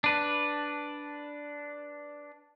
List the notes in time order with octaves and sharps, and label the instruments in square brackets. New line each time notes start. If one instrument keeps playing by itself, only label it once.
[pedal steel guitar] D4 B4